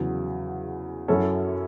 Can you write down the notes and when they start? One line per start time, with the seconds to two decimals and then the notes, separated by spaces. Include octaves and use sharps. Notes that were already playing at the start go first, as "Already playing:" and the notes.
Already playing: E2 C#3 F#3
1.08 F#2 F#3 C#4 E4 A4